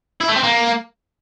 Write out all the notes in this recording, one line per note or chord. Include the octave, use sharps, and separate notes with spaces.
E4
A3
C4
A#3